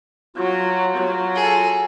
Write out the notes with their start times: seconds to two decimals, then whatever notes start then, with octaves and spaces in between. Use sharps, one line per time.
0.37 F#3 F4 F#4
0.96 F#3
1.35 G#4 A4